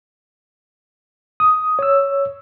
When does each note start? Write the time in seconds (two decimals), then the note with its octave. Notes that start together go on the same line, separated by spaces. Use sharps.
1.40 D#6
1.79 C#5 E6